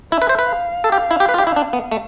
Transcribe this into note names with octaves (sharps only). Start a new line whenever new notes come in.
E4 E5
B4
C5
B4
F5
A4
G4
E4
G4
B4
F4
G4
E4
D4
B3
A3